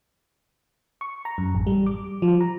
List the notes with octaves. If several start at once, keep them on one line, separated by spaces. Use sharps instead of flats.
C#6
A#5
F#2
A1
G3
D6
F3
A#5